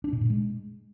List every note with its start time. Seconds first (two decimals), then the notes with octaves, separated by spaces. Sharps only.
0.04 D4
0.13 B2
0.21 A#2
0.30 G#3